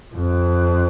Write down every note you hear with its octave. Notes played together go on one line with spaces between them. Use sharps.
F2